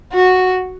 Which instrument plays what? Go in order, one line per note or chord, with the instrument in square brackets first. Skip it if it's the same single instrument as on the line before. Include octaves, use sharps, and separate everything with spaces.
[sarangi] F#4